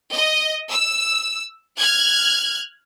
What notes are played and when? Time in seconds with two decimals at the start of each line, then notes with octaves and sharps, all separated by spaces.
0.13 D#5
0.71 E6
1.78 F6 F#6 G#6